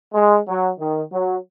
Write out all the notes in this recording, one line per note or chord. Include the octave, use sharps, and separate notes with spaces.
G#3
F#3
D#3
F#3